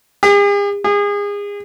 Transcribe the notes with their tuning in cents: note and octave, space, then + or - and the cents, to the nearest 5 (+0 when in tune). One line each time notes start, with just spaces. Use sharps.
G#4 -45
G#4 -30